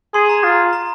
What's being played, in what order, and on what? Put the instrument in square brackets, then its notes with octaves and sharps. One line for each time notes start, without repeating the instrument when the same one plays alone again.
[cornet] G#4 [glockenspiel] C6
[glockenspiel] A#5
[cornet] F4
[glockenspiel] A#5